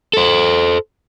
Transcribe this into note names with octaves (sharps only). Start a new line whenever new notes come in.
A4 C5